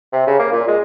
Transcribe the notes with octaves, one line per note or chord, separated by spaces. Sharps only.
C3
C#3
A#3
A#2
G#3